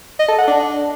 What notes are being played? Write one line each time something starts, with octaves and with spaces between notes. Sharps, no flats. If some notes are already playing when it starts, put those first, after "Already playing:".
D#5
A4
F#5
D4